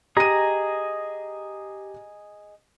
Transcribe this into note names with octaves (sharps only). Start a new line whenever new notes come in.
G4 G#4 D#5 A#5 D#7